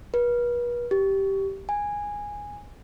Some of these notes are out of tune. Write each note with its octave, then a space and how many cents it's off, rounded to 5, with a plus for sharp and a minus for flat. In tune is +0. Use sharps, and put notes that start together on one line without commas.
B4 -40
G4 -10
G#5 -10